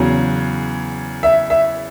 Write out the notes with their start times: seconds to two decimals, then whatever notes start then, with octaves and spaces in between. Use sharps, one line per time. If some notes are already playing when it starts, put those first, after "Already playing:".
Already playing: E2 C#3 F#3
1.23 E5
1.50 E5